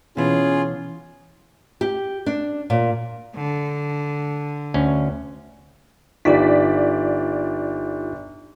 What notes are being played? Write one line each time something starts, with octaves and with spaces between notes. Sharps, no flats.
B2 E3 C#4 F4 G#4
G4
D4
A#2
D3
D2 C#4
G1 D#4 F4 G4 D5 B6